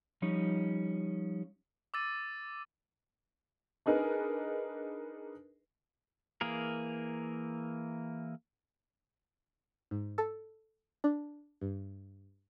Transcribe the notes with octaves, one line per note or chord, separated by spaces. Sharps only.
F3 G3 C#4 D#4
D6 E6 A6 D#7
D4 D#4 G#4 A#4 B4
E3 A#3 G#4 A#4
G#2
A4
D4
G2